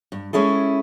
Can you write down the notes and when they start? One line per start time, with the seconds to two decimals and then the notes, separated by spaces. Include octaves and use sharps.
0.12 G2
0.33 G#3 C#4 E4 G#4 A4